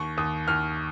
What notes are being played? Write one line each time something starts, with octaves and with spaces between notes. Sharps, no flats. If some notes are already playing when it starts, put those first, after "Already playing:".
Already playing: D#2 C#6
D#2 D#6
D#2 F6